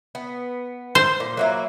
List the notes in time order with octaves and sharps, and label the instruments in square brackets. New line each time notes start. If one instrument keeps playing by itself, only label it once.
[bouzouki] B3
[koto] C5
[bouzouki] A#2
F#3 A#3 E4